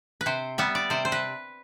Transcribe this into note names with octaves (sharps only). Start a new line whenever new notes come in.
B4
C3 C5
G3 B3 E5
D5
C3 C5
C5
B4